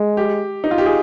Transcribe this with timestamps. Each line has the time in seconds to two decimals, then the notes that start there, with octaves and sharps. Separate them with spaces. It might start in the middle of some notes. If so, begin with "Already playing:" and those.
Already playing: G#3
0.17 G4
0.64 D#4
0.71 F4
0.78 G4
0.86 G#4